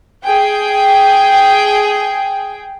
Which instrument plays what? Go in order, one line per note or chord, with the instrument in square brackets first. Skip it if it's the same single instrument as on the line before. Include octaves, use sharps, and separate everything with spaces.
[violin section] G#4 G5